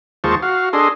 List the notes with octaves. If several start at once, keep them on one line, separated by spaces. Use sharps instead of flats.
D#2 G#3 F4 C5 A5 C#6
F#4 F5
D4 G#4 A4 D#5 C6